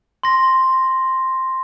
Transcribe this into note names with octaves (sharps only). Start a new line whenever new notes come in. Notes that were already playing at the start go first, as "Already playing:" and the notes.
C6 A#6